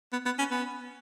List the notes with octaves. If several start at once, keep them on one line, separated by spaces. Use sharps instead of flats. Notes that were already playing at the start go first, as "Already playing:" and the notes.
B3
B3
C#4
B3